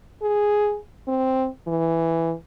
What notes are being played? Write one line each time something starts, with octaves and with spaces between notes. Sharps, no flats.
G#4
C4
E3